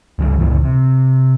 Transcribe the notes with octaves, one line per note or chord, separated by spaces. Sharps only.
C#2 E3 F3 G3
G1 C#2 A#2 E3
C3